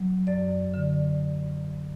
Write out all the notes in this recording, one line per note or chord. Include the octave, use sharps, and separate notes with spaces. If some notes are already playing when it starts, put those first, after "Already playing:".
Already playing: F#3
F#2 D5
D3